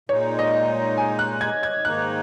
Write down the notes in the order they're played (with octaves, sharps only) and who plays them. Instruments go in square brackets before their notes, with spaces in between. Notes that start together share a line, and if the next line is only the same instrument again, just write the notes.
[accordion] A#2 G#3 D#4 [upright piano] C#5
[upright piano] D#5
G#5
F#6
G#6
G#6
[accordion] G#2 D#3 A#3 D#4 [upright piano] F#6